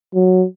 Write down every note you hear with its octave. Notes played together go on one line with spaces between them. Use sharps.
F#3